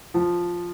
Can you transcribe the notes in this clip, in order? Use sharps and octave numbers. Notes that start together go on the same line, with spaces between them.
F3